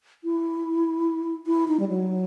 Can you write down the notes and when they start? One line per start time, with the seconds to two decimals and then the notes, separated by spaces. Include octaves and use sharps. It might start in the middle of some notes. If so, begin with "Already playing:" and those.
0.24 E4
1.47 E4
1.68 D#4
1.80 G3
1.88 F#3